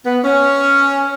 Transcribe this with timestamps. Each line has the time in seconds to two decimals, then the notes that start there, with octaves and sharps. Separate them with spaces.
0.05 B3
0.24 C#4